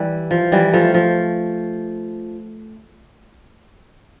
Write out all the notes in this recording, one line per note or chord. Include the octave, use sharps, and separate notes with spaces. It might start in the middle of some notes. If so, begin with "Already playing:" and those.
Already playing: E3 G3
F3
E3 G3
F3 A3
F3